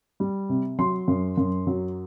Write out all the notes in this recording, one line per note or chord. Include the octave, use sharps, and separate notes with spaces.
G3
C3
F#3 C6
F#2
F#2
F#3